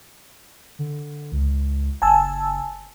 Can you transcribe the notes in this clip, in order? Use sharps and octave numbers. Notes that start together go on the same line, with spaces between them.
D3
C#2
F#1 G#5 A5 E6